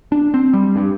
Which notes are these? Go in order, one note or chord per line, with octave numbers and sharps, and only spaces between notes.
D4
C4
G3
G2